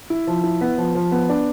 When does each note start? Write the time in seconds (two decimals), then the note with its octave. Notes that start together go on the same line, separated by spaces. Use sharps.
0.10 E4
0.27 F3
0.43 E4
0.61 B3
0.78 F3
0.95 F3
1.12 B3
1.29 D4